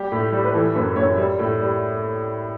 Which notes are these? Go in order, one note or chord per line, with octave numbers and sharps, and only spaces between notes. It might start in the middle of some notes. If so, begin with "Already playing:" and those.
Already playing: G3 G4
A2
G3
B4
E3 A4
F#2 B4
F#2 C#5
G3
A2
G3